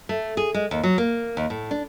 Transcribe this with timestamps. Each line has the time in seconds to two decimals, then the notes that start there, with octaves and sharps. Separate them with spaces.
0.09 A3
0.37 G#4
0.54 G#3
0.71 D#2
0.83 F#3
0.98 A#3
1.37 D#2
1.50 A2
1.71 D4